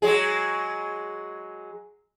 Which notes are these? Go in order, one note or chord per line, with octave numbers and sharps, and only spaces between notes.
F#3 G#3 G#4